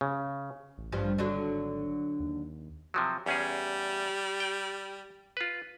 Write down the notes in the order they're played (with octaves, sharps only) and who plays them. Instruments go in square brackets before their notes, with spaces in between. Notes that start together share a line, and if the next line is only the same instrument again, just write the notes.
[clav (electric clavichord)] C#3
[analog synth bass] A1
[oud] G2 F3 G3
[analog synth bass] G#1 [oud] D3 F#3 D4
[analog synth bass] D#2
[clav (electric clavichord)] C3 F3 F#3
[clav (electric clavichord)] E2 C#4 G#4 [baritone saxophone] G3
[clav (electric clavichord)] G5
F4 B4